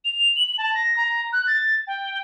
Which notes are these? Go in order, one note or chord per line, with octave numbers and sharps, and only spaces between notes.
F7
F#7
A5
A#6
A#5
F#6
A6
G5